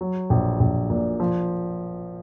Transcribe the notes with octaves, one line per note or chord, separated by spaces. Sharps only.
F#3
A#1
A#1
A#2
F3